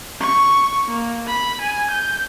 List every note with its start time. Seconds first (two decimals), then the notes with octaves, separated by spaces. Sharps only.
0.21 C#6
0.88 A#3
1.27 B5
1.61 G#5
1.91 G6